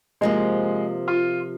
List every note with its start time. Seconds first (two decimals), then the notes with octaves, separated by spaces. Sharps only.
0.21 C3 F3 G#3 A#3
1.08 F4